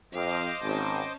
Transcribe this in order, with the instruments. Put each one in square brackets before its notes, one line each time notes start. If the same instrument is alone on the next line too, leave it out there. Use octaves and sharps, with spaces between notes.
[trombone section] F2 [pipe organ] C5 D#5 D6 [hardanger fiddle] F5
[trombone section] G#1 [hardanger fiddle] C#4 A5